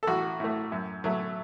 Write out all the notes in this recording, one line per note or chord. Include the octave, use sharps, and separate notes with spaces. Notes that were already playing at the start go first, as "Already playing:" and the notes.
A4
A1 F#4
A2 A3
F#2
F#3 A3